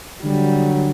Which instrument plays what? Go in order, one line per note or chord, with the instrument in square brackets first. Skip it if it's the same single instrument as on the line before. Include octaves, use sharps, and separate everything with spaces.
[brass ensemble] D3 F#3 [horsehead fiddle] G3